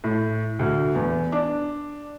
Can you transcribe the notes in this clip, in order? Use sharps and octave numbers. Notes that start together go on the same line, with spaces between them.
A2
D2
E2
D4